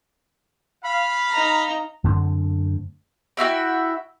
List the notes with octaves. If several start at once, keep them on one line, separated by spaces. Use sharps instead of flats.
F5 B5
D#4 A#5
F#2 D3 A3 C4
E4 F#4 E5 G5